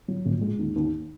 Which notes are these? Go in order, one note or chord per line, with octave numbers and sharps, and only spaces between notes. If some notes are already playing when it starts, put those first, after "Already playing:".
F#3
A#1
G#3
D#2
D#2